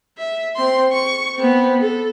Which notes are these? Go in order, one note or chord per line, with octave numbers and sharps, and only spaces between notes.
E5
C4 C6
C#6
B3 C4
A4